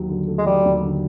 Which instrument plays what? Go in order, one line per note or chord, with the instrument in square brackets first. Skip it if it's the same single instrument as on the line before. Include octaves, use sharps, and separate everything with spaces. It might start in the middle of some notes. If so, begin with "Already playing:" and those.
Already playing: [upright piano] D#2 F#3
D3
A3
[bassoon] G#3
[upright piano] F#3 [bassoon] G3
[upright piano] D#2
D3